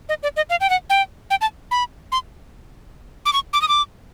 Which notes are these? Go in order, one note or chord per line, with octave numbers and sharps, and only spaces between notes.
D#5
D5
D#5
F5
G5
F#5
G5
G5
A5
B5
C6
D6
C#6
D6
D#6
D6